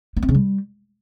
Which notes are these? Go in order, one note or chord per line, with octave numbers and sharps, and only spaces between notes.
B3
C4
C#3
G3